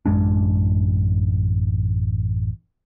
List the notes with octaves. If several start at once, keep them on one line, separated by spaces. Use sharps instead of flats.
A1 F#2 G#3 D4